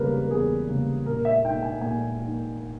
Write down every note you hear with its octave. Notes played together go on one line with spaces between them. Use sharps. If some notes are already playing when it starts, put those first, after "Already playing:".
Already playing: E2 C#3 G3 A#3 A#4 B4
A#4
E2 G#4
C#3 G3 A#3
A#2 A#4
E5
A#3 D#4 G5
G#5
A#2 G#5
A#3 D#4